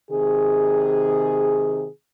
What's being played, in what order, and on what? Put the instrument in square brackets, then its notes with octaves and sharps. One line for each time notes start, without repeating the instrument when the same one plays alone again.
[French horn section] C3 D#3 G#4